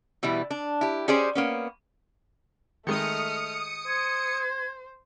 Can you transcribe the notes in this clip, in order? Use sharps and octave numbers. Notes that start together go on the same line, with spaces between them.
B2 E3 G3 E4
D4
E4 G4
C#4 G4 G#4 C5 D5
A#3 B3 C#4
D#3 G#3 A3 D#4 D#6 F6 C#7
C5 G#6